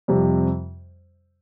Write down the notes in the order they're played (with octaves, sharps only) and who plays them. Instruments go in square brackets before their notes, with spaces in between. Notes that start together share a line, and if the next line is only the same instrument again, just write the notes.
[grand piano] F2 C3 G3